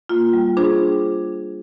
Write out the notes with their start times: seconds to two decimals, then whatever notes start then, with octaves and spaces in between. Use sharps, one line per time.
0.09 A#3 F4
0.33 G3
0.57 D4 F4 G#4 C5